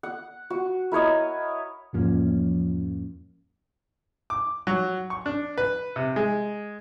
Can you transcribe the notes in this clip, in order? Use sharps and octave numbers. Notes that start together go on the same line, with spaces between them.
F#5
F#4
E4 A#4 C#5 D#5
E2 G#2 F3 A#3 C#4
D6
F#3
C#6
D4
B4
C3
G#3